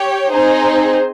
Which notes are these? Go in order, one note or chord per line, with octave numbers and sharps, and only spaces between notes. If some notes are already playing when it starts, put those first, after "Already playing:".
Already playing: G4 C#5 G5
C4 D#4 G#4 C5